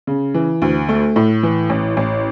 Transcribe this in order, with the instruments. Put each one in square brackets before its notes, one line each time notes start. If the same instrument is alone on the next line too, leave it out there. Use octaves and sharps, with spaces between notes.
[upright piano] C#3
E3
D2
A3
A2
E3
A1
A1